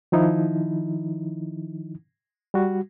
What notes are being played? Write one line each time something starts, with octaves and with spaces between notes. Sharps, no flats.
D#3 F3 D#4 E4
G3 F#4